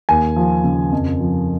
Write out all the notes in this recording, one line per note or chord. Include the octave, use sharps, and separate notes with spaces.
D#2 G#5
F3
C#3
F2
F3